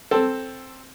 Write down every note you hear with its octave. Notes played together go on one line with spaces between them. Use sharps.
C4 A4